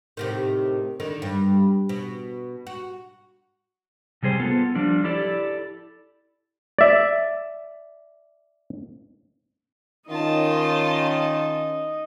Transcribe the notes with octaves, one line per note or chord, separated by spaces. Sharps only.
A2 C3 D#3
D3 D#3 D#4
G2
B2
F#4
C3 G3 G#4 C5
B3 F4 A4
F3 G3 D4
E4 G4 A4 D5
D5 E5
D#3 C#4 D#4 F4 D#5 A5